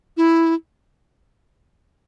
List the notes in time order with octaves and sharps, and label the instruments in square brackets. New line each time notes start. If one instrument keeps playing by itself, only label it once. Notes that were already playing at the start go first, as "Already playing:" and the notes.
[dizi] E4